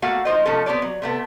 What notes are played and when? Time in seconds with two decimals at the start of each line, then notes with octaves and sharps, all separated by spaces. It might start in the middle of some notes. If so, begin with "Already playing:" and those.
0.02 A3 A#3 F#4 F5 F#5
0.25 D#4 F4 C5 D#5
0.46 C3 F3 A3 C#4 A4
0.66 B3 C4 G4 C#5 D5
0.82 F#3
1.02 C3 A3 B3